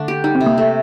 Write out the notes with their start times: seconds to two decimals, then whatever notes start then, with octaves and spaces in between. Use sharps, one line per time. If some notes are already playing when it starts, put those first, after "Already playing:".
Already playing: D3 A3 D4
0.08 G4
0.24 G3 D#4
0.35 C4
0.41 C3
0.46 A#3
0.58 A3